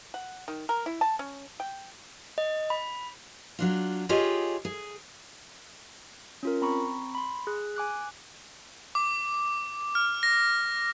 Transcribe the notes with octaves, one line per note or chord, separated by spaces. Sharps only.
F#5
D#3
A#4
E4
A5
C#4
G5
D#5
B5
F#3 D4 F4
F4 G4 G#4 C#5 D#5
G#4
C#4 F4 A#4
C4 A#5 B5 C#6
B5 C6
G#4 F#6
G#5 D6 F#6
D6
F6
A#6